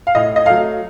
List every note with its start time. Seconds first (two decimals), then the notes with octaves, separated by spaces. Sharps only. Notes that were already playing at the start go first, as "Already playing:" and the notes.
0.07 F5
0.15 A2 D#5
0.36 D#5
0.46 F#3 A3 F5